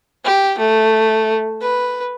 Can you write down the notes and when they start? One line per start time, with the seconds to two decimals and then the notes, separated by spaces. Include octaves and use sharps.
0.24 G4
0.58 A3
1.61 B4